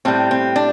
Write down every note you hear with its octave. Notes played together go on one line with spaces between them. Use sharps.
A2 G3 C4
C4
D4